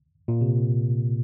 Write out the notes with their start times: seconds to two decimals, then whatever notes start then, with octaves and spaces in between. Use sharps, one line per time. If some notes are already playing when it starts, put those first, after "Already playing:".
0.28 A#2
0.41 C3